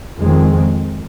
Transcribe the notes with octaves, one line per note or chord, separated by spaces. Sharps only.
F2 D#3 G#3 C4